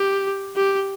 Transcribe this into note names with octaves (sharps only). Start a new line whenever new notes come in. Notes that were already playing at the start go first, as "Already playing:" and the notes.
Already playing: G4
G4